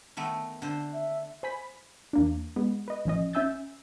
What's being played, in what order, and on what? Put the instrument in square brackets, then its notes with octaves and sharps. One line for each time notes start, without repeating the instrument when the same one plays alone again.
[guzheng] D#3 A3 B3
D3 C5
[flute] E5
[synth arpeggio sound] C5 G#5 B5 B6
E2 A#3 D4
G#3 B3
B4 D#5
A1 F3 C#4 D#5
C#4 E5 G#5 E6 G6 A6